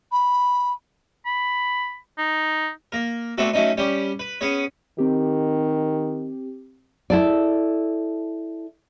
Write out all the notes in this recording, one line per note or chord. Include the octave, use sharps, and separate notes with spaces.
B5
B5
D#4
A#3 A#4
A3 B3 C4 D4 F#4 A4
F#3 A3 C#4 D#4
G3 C#4 G4
B4
B3 C#4 G#4 C#5
D#3 C4 G4
E4 A4 D5